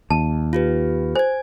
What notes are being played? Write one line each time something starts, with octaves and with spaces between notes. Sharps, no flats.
D#2 A5
F4 G4 B4
C5 G#5 G#6